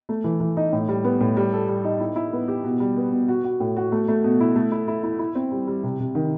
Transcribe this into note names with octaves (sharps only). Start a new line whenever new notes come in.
A3
E3
E3
D#4
A2
G3
B3
A2
G3
A4
G3
D#4
E4
E4
B3
G4
B2
G3
B3
B2
F#4
F#4
A2
F#4
A3
A3
B2
E4
A3
E4
E4
E4
E4
C4
G3
G3
C3
C3
D#3